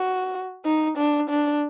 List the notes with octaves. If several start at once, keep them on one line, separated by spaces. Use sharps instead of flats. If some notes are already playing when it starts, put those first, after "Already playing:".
Already playing: F#4
D#4
D4
D4